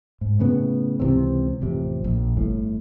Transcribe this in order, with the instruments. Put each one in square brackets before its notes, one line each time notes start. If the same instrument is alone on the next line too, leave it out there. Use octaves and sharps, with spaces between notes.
[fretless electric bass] G#2
A2 C#3 B3
C#2 C3 E3 C4
A1 F2 C3
A#1
G1 A2